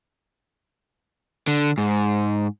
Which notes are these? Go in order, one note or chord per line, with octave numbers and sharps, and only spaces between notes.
D3
G#2